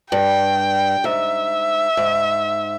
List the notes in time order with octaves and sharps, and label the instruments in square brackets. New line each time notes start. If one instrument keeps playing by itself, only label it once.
[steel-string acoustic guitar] G2 [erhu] G5
[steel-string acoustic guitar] G#2 [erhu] E5
[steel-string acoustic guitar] G#2